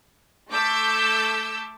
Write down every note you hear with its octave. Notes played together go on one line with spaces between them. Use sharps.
A3 A5 D6 E6 G6 B6